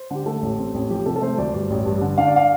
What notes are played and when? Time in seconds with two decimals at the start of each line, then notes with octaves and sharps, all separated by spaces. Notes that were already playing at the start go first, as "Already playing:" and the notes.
Already playing: C5
0.10 D3 G4
0.26 A3 A4
0.42 A1
0.58 C4
0.74 A1
0.90 F3 G4
1.06 C3 A4
1.16 A4
1.22 A3 C5
1.38 D2 D5
1.54 G2 D5
1.70 A1
1.86 G2
2.01 D3
2.18 D4 F5
2.27 D5
2.36 F5